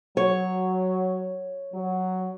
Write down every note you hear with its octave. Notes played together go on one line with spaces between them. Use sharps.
F#3 C#5
F#3